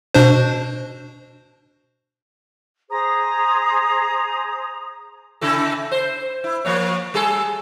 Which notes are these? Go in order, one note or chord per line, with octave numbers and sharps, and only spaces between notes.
B2 D4 C5
G#4 C5 A#5 D#6
C#3 E4 A4
C5
E4
F3 A#3 C#5
G3 G#4 A4